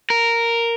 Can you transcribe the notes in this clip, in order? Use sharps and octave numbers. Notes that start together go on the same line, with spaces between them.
A#4